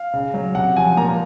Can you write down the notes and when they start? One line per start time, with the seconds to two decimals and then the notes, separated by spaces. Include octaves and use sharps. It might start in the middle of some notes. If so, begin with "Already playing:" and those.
Already playing: F5
0.14 C#3
0.34 F#3
0.55 C3 F#5
0.76 F3 G#5
0.97 A#2 A#5